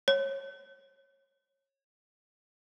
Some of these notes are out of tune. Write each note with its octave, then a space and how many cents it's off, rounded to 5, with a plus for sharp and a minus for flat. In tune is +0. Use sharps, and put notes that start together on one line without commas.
C#5 -20